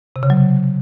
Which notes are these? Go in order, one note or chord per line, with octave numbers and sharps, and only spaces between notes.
C3
C#3
F#3